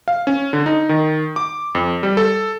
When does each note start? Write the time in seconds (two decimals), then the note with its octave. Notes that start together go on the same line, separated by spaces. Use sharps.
0.08 F5
0.27 C#4
0.53 D3
0.66 D#4
0.89 D#3
1.36 D6
1.75 F2
2.03 G3
2.17 A4